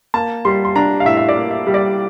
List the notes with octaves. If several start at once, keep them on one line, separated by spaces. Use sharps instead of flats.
A#3 A5
G3 C6
C6
D4 A#5
F5
A2 E5
E5
D5
A#3
E5
G3
D5